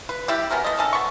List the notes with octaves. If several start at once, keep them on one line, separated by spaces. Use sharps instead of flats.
B4
G3 E4 G4
B3 C#4 F#4 A#4
A3 D#5
D#3 C#4 A4
B3 C#6